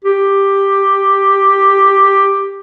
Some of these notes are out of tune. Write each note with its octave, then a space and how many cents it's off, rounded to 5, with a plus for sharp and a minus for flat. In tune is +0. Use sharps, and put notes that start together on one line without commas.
G4 +5